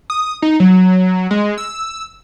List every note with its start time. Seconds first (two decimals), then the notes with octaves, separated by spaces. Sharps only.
0.10 D#6
0.42 D#4
0.60 F#3
1.31 G#3
1.58 E6